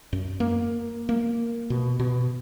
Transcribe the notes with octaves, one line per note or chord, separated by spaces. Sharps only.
F#2
A#3
A#3
B2
B2